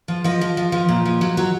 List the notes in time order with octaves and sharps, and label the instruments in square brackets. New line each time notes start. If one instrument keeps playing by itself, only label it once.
[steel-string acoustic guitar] F3
F3 D#5
F3
F3
F3
A#2
F3
F#3
F#3